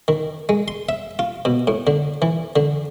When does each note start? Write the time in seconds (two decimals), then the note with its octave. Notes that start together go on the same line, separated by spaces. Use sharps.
0.08 D#3
0.49 G#3
0.68 C6
0.89 E5
1.19 F4
1.45 B2
1.67 A2
1.87 D3
2.22 E3
2.56 D3